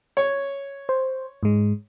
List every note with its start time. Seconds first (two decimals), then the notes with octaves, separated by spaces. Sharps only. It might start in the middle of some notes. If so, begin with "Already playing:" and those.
0.17 C#5
0.89 C5
1.43 G#2 G#3